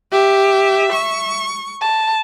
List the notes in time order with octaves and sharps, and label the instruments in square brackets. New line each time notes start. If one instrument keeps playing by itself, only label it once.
[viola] G4 [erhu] E5
[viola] C#6
[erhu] A5